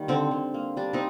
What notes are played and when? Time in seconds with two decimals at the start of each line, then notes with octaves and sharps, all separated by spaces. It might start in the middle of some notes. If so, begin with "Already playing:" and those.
Already playing: D#3 G3 A#3
0.08 D3 C4
0.31 D3
0.54 A#3
0.77 G3 D4
0.93 C4 D#4